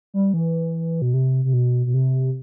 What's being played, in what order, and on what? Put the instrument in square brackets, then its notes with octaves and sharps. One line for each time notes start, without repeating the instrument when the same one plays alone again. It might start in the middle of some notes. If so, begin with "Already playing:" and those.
[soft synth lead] G3
E3
B2
C3
C3
B2
B2
C3